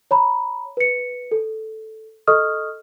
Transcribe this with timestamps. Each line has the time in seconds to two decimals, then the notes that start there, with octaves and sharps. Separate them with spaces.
0.11 C#5 A#5 B5
0.77 B4 C#7
1.31 A4
2.27 A4 D#5 C#6 D#6 F6